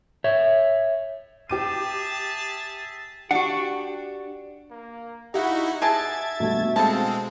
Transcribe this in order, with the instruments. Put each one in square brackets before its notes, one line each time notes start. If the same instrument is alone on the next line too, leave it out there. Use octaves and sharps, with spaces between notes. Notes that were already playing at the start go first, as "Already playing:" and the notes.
[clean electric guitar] C#5 E5
[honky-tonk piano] G4 D6 D#7 [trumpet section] G#4 E5 A5
[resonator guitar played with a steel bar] D4 F#4 [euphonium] G4 [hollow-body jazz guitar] F#5
[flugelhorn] A#3
[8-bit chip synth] D#4 E4 F#4 [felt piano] G4 F5 [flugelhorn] F#5
[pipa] G#4 D#5 A5 [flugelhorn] E5 [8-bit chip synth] G#6 A6 [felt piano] D7
[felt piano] G2 B2 A3
[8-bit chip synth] G#3 C4 [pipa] A4 A5 [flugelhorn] F5